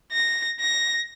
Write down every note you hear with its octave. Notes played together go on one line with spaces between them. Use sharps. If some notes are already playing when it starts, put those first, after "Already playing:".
A#6
A#6